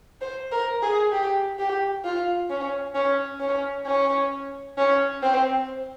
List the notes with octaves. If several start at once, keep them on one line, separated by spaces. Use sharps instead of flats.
C5
A#4
G#4
G4
G4
F4
C#4
C#4
C#4
C#4
C#4
C4